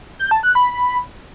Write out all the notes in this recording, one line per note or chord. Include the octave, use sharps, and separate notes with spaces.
G6
A5
F#6
B5